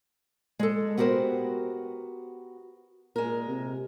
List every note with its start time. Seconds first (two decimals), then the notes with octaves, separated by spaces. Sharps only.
0.59 G#3 A4
0.97 B3 F#4 G4 A#4 C5
3.16 A#2 G#3 A#4
3.48 C3